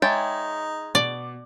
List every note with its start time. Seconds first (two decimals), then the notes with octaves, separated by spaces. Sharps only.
0.02 G#3 D#4 C#5 E5 G5 A5
0.95 B2 D5